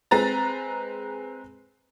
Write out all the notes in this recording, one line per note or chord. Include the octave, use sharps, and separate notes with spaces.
G#3 C4 B4 A#5 A6